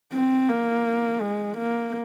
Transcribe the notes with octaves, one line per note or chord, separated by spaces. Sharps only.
C4
A#3
G#3
A#3